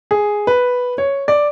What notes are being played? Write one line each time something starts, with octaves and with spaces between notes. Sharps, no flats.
G#4
B4
C#5
D5